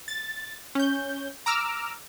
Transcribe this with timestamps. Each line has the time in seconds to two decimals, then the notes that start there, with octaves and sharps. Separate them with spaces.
0.08 A6
0.75 C#4 G6
1.46 A#5 D6 E6 F6